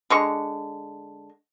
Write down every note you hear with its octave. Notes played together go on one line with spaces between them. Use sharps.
D3 G#3 C#6